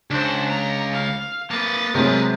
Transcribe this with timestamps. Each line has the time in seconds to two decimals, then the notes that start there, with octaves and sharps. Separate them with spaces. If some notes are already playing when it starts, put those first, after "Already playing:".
0.10 C#2 D4 C5
0.48 A#5
0.93 F5
1.51 A#3 B4 D#6 A6
1.95 C3 F#3 G#3 A#4 B4